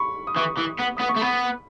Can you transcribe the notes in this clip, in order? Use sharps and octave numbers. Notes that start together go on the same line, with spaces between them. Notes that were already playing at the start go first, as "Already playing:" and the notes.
Already playing: B5 C#6
D#6
E3 C#6
E3
B3
B3 D#6
C#6
A3
B3 B5